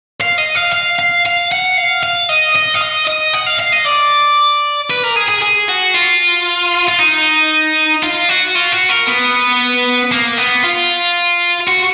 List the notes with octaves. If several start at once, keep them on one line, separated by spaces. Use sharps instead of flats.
F5
D#5
F5
F5
F5
F5
F#5
F5
F5
D#5
D#5
F5
D#5
D#5
F#5
F5
F5
D#5
D5
B4
A#4
G#4
G#4
G#4
F#4
F4
F4
D#4
F4
F#4
F4
F#4
A#4
B3
A#3
B3
F4
F#4